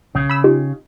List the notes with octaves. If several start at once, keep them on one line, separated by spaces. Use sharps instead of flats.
B1 C#3
B5 E6
D#4 F4 G4